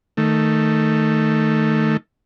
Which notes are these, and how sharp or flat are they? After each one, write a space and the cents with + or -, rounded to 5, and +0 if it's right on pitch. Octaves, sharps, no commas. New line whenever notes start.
D#3 +0 A3 +5